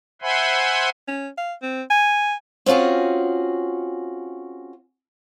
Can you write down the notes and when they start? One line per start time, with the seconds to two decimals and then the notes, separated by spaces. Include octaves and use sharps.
0.22 C5 E5 F#5 G#5 B5 C6
1.08 C#4
1.38 F5
1.62 C4
1.90 G#5
2.66 C4 C#4 F4 F#4 G#4